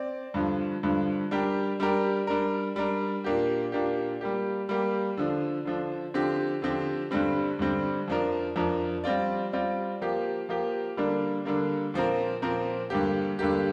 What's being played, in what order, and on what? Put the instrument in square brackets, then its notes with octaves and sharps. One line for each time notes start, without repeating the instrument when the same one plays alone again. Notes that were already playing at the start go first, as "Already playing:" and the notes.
Already playing: [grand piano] C4 D5
G2 D3 F3
G2 D3 F3
G3 D4 G4 A#4
G3 D4 G4 A#4
G3 D4 A#4
G3 D4 A#4
A#2 A#3 D4 G4
A#2 A#3 D4 G4
G3 A#3 G4
G3 A#3 G4
D3 F3 D4
D3 F3 D4
D3 F3 C4 G4
D3 F3 C4 G4
G2 D3 G3 C4
G2 D3 G3 C4
F2 F3 D4 A#4
F2 F3 D4 A#4
G3 C4 F4 D5
G3 C4 F4 D5
F3 A#3 G4
F3 A#3 G4
D3 G3 A#3 D4
D3 G3 A#3 D4
A#2 F3 C4 A#4
A#2 F3 C4 A#4
G2 D3 A#3 G4
G2 D3 A#3 G4